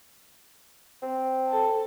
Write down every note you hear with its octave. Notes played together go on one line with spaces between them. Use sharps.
C4
A4 A5